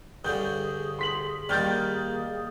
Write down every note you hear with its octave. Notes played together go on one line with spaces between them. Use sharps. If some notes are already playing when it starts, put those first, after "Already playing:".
G2 D3 C#4 G#4 G6
C6 B6 F#7
D#3 G3 A#3 F6 G6 A6